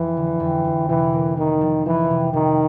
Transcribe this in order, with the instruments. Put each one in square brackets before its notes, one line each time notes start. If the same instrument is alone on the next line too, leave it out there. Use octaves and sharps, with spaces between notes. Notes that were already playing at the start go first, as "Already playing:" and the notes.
Already playing: [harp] F2 F3 [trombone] E3
[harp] D3
F2
F2
[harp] C3 [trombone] E3
[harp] A#3
[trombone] D#3 [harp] A#3
[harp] F3
[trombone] E3 [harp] F3
[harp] C3
[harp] C3 [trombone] D#3